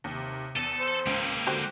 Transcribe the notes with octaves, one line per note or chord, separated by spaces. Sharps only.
D#2 C3
E2 A4 A5 D#7
C5
C#2 G#3 A#3
D3 F#4 G4 C5